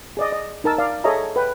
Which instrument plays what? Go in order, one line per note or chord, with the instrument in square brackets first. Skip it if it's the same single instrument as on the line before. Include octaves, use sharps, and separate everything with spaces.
[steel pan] G#4 D5 D#5
D#5
D#4 A#4 A5 E6
D5 F5
G#4 A4 C#5 D#5 E5 A#5
B4 G5